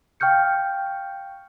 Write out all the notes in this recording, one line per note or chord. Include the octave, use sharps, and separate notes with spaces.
F5 G5 C#6 F6 G6 C#7